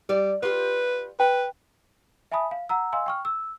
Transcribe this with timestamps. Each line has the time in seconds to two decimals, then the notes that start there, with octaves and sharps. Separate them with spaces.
0.09 G3 D5
0.43 F4 G4 B4
1.20 B4 G5
2.32 E5 G#5 A5 B5 D#6
2.51 F5
2.69 F#5 A#5 E6
2.93 D#5 F5 G#5 C6 E6
3.06 G5 C#6 F6
3.25 E6